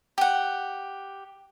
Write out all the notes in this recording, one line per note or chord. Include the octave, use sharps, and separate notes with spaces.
G4 F#5